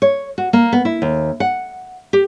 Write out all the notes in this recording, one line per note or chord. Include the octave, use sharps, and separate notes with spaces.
C#5
F#4
A#3
B3
E4
D#2
F#5
G4